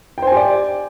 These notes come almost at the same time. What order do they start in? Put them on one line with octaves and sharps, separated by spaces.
G5 C5 G#5 G4 D5